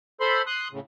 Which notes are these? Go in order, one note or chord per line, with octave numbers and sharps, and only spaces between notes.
A4 C5 B5 C6
C6 D#6 F#6
A2 C#3